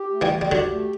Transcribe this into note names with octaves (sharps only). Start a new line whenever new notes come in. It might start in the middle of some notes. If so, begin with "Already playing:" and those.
Already playing: G4
A3
E3 G3
G4
G3
D3 F#3 G4
A3